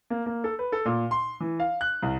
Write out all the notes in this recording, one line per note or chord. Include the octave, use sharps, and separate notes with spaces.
A#3
A#3
A4
B4
A4
A#2
C6
E3
F5
F#6
C2